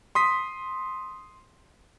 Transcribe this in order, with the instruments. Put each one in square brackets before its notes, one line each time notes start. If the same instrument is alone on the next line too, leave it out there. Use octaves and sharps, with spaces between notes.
[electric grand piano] C6 D#6 B6